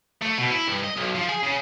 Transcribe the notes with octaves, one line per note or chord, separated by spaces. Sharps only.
A3
B2
E4
G2
D#5
B1
F3
G#4
C#3